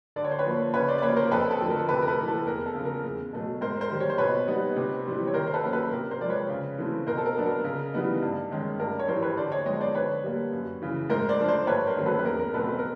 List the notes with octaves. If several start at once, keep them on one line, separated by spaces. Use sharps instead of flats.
D3 D5
C#5
C5
B4 C#5
F3 A#3
C#3 B4 C#5
C5 D5
D5
F3 A#3 B4 C#5
A#4 C5
F2 A4 B4
A4
D3 F3 A3
A#4
C3 A4 B4
A#4
A4 B4
E3 A3
A4
E2 A#4
A4
C#3 F3
A#4
E2
B2 F#3 A3
G#2 A#4 C5
A#4 C5
D#3 G3
C#5
C5
B2 B4 C#5
G3 B3 D#4
C3
E3 G3 C4
C#5
D#3 A#4 C5
C5
A4 B4
F#3 A#3 C#4
A4 B4
C3 A#4
A#4 C5
F3 G#3 D5
B4 C#5
C#3
E3 A3 C4
B2 A#4 C5
A4
A#4
F#3 B3 D4
A#4
C#3 A#4
E3 G3 B3 D#4
G2
D#3 G#3 C#4
G2 A#4
C#5
E3 G3 A#4 C5
B4 C#5
D3 C5 D5
C#5 D#5
F3 G#3 B3 D#4 C#5 D#5
C5 D5
D3 B4 C#5
G3 A#3
F#2
C#3 E3
G#2 A#4 C5
C5 D5
F3 A3 D4
C5 D5
G2 B4 C#5
A#4 C5
D#3 F#3 A3 C#4
A4 B4
B4
E2 A#4
A#4
B2 F#3 A3 C4 A4 B4
B4
A#4